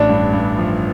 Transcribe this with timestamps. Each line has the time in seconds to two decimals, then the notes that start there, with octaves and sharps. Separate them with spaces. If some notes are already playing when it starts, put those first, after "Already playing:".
Already playing: A1 A2 D4
0.09 G2
0.33 G2
0.57 F3